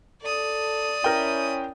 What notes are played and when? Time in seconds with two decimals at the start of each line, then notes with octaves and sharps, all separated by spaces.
0.22 A4 D5 D#6
1.04 C#4 E4 A#4 G5